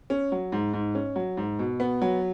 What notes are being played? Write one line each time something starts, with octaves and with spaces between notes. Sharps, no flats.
C#4
F#3
G#2
G#2
C#4
F#3
G#2
B2
B3
F#3